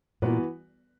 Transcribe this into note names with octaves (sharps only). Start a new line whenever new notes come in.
A#2 E3 B3 F#4 B4